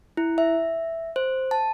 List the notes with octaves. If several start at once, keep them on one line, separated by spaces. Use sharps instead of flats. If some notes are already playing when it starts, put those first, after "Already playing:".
E4
E5
C5
A5